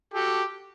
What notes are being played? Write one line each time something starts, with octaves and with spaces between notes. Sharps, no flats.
F#4 G4 A4